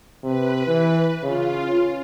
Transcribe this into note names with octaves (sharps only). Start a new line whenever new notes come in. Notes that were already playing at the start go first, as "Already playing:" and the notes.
C3 B4
E3
C#3 F4
C#4